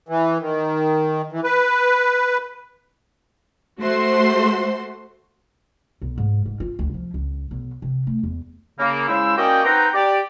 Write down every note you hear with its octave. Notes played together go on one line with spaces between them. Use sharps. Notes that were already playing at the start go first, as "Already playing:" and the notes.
E3
D#3
E3
B4
A3 F#4 C5 C6
B1
G#2
G#2
F4
D2
F3
C#2
B1
C3
A3
E2
C#3 A#3
C#3 G#3 E4 C5 E6
A#3 C#4 F#4 D5 D#5 G5
C4 D#4 B4 F#5 G5 A#5
G4 D5